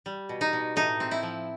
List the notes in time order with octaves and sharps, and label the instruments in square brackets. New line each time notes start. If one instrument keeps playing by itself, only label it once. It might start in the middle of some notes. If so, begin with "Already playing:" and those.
[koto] G3
B2
D#4
B2
A2 D#4
C4
E4
F3